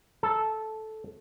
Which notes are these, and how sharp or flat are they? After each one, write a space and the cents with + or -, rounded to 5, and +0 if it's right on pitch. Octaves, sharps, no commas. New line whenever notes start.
A4 -10